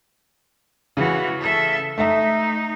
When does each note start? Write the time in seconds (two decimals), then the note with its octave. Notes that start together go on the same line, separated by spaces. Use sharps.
0.97 C#3 E3 F#4
1.41 A4 E5
1.98 A3 D#4 E5